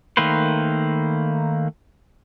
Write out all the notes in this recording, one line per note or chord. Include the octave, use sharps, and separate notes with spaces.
D#3 A3 A#3 B4 C5